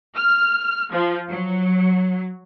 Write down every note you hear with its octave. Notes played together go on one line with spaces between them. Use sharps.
F6
F3
F#3